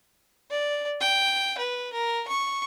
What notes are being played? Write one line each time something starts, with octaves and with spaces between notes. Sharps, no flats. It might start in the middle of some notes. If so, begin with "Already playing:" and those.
D5
G5
B4
A#4
C#6